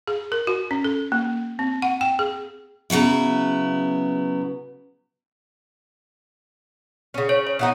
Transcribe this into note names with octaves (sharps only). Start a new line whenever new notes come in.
G#4
A#4
F#4
C#4
A4
A#3
C4
F#5
G5
G#4
C#3 F#3 B3 E4
C#3 C#4
C#5
C#5
E3 B3 D#4